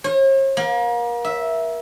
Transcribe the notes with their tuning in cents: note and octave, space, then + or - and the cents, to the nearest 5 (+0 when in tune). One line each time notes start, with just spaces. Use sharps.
C#5 -45
A#3 +35
E5 -5